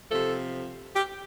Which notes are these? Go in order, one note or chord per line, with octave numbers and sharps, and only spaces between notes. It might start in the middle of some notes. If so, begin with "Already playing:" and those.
C3 F3 A4
G4